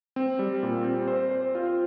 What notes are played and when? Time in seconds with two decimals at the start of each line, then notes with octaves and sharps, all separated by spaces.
0.16 C4
0.39 G3
0.63 A#2
0.85 C4
1.08 C5
1.31 C5
1.55 F4